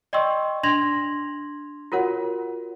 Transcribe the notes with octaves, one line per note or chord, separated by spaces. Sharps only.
D5 D#5 G5 C6 C#6 E6
D4 C6 G#6 A#6 F7 F#7
F4 F#4 A#4 C#5 F#5